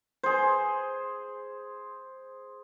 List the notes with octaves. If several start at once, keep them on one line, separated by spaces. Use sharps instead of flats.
G#4 C5